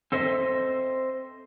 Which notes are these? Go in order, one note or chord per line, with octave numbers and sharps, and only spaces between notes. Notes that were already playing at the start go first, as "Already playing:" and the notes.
C4 A4 C5 D#5 E5